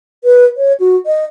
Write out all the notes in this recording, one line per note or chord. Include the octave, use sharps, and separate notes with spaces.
B4
C#5
F#4
D#5